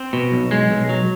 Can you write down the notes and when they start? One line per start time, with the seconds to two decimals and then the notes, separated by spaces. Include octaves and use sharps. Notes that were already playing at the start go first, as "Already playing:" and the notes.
Already playing: C4
0.13 B2
0.32 B1
0.51 G#3
0.70 B1
0.89 F#3